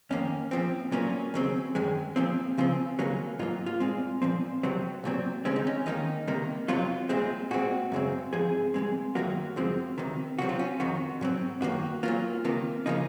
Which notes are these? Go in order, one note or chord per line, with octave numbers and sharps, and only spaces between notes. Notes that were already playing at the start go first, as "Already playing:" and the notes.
F2 D#3 A#3 C#4
A#2 F3 C4
A#2 F#3 A#3 C#4
D#2 C#3 F#3 C4
F#2 D#3 G#3
A#2 F3 C4
C#2 C#3 F3 C4
D#2 C#3 F#3 A#3
G#2 F#3 A#3 F4
F4
A#2 G#3 C4
A#2 F3 C4
C2 C3 F#3 C4
C2 A#2 F#3 C4
D#2 C#3 G#3 C4 C#4
D#4
C#4
D#2 D#3 A#3 D#4
C2 C3 D#3 A#3
F2 C3 F#3 F4
C2 A#2 G#3 C4
A#2 G#3 C4 F#4
F#2 C#3 G#3 C4
G#2 F3 C4 G#4
C2 A#2 G#3 C4
F#2 D#3 F#3 A#3 F#4
F#2 C#3 F3 G#3 C4
C#2 C3 D#3
C2 C3 F#3 C4 F#4
F4
C#4
F2 C3 D#3 F#4
G#2 F#3 C4
F#2 D#3 A#3 F#4
A#2 F#3 A#3 F4
C#2 C3 D#3 A#3
C#3 F3 A#3 D#4